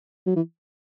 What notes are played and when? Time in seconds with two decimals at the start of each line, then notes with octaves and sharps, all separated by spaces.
0.26 F#3
0.36 E3